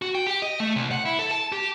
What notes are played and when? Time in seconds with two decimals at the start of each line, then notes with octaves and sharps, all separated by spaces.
0.02 F#4
0.15 G5
0.27 G4
0.42 D#5
0.60 A3
0.76 C2
0.91 F#5
1.05 E4
1.19 A4
1.31 A5
1.52 G4